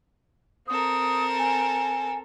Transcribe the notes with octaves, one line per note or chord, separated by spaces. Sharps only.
C4 A4 A#4 D#6
G#5